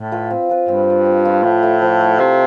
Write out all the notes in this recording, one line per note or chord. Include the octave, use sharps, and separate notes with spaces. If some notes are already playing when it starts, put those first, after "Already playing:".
Already playing: A2
F4 B4
C4
F4 B4
G2 C4
F4 B4
C4
F4 B4
A2 F3
A3 E4
F3
A3 E4
C3 F3